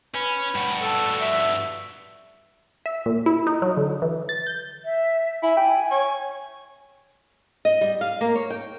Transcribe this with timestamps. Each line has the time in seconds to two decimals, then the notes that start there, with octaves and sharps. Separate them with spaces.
0.15 C#4 B4
0.55 G2 F#4
0.81 A4
1.21 E5
2.86 E5
3.06 A#2
3.26 E4
3.47 D#4
3.62 F#3
3.77 D3
4.02 E3
4.29 A6
4.47 G6
4.85 E5
5.43 E4 G#5
5.57 G5 G#5
5.91 C#5
7.65 D#5
7.81 G3
8.01 F5
8.21 A#3
8.35 C#5
8.51 G5